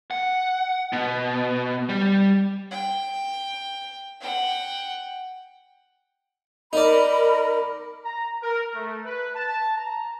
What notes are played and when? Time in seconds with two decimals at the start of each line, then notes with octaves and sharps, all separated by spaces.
0.11 F#5
0.93 B2
1.89 G3
2.71 G5
4.21 F#5 G5
6.73 D#4 A#4 D5 B5
8.04 A#5
8.42 A#4
8.74 A3
9.04 B4
9.34 A5
9.77 A#5